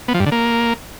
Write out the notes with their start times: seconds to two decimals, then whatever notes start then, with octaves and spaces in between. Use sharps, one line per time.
0.08 B3
0.14 F3
0.20 G2
0.26 D3
0.32 A#3